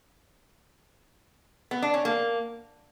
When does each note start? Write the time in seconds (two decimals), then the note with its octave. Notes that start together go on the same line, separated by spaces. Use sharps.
1.71 B3
1.82 D4
1.94 C#4
2.05 A#3